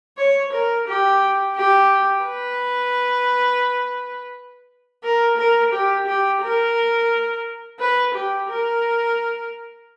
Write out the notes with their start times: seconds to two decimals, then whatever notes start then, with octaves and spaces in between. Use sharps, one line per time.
0.17 C#5
0.52 A#4
0.87 G4
1.56 G4
2.25 B4
5.03 A#4
5.38 A#4
5.72 G4
6.06 G4
6.42 A#4
7.80 B4
8.15 G4
8.49 A#4